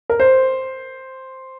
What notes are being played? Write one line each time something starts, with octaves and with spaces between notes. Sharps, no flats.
A#4
C5